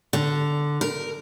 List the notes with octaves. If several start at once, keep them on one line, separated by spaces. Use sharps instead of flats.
D3
A#4